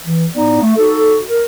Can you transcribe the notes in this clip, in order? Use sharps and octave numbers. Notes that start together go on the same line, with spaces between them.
E3
A2 B3 D#4 D5
A3
D#4 F#4 A4
A#4